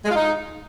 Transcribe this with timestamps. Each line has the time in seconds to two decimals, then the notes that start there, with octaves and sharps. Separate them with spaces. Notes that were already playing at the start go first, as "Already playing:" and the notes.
0.05 G#3
0.11 F4
0.16 D#4